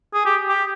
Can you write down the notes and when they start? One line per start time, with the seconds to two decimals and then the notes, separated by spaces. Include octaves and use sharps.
0.14 G#4
0.25 G4
0.49 G4